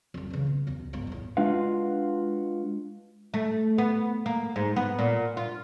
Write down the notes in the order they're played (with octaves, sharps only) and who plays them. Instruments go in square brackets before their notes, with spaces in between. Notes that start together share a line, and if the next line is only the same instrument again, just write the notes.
[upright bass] F2 G3
C#3 E3
B2
E1 C#2
G1 G#2
E2 A2
[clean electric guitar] G#3 D4 F4 F#4 B4 F5
[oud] A3
B3
A#3
G#2
B3
A#2
F4